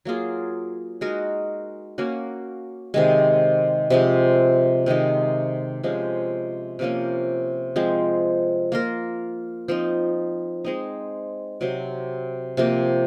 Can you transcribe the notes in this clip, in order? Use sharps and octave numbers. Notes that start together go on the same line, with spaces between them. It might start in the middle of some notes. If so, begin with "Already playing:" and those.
F#3 A#3 F4 G#4
G#3 D#4 F#4 A#4
A#3 C#4 F#4
C3 D#3 G#3
C3 F3 G#3
C3 D#3 G#3 D#4
C3 F3 G#3 C#4
C3 F3 A#3 C#4
F3 G#3 C4
A#3 F4 A#4
F3 C4 D#4
G#3 C4 D#4
C3 F#3 C4
C3 F3 A#3